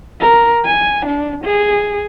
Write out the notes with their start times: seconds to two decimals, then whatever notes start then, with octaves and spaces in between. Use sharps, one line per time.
0.21 A#4
0.65 G#5
1.06 D4
1.44 G#4